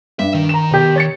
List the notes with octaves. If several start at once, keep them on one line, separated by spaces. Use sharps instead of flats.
G2 E5
D#3
A#5 E7
B2 G4
C#5 A6 C#7